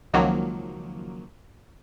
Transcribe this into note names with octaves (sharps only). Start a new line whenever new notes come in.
C#2 D#3 F3 F#3 A#3